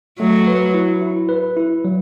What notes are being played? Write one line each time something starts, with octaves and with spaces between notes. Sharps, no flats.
F#3 A3
B4
E4
E4
B4
E4
F#3